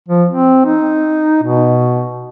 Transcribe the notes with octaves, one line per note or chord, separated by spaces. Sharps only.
F3
C4
D#4
B2